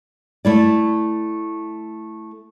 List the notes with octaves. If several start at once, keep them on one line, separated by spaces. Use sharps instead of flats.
A3 E4 D5